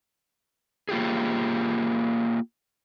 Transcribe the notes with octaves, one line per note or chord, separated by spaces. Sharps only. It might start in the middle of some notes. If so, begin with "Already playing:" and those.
A#3 F4 G4 G#4